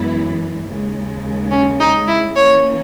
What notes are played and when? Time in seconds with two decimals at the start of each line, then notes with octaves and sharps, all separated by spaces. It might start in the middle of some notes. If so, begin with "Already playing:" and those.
Already playing: F#2 E3 G#3 B3 E4
0.67 D#2 C#3 G#3
1.51 C#4
1.80 D#4
2.07 E4
2.36 E3 A#3 C#4 C#5